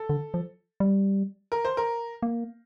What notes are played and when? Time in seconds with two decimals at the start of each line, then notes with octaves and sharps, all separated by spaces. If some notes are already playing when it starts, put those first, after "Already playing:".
Already playing: A4
0.09 D3
0.34 F3
0.80 G3
1.52 A#4
1.65 C5
1.77 A#4
2.23 A#3